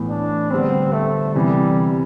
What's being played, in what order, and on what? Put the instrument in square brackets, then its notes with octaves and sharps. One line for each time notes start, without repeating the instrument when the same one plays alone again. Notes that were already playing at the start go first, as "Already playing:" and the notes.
Already playing: [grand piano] A2 E3 B3
[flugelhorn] D4
[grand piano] D3 G3 B3 [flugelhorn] C4
[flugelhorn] A3
[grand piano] C3 E3 B3 [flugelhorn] G3